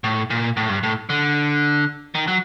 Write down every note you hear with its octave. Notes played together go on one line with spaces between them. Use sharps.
A2
A#2
A2
G2
A2
D3
D#3
F#3